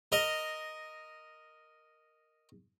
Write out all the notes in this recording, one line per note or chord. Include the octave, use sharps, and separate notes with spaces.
A#4 D#5